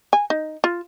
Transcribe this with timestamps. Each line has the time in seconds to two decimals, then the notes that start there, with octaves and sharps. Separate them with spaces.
0.13 G#5
0.30 D#4
0.64 F4